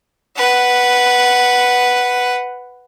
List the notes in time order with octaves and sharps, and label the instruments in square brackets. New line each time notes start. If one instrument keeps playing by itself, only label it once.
[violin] B4 F#5